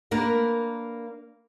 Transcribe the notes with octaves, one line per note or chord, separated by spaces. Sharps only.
A#3 D4 A#4 B4